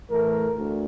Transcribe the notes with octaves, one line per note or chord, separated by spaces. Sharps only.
A2 E3 A3 A#4
D2 D3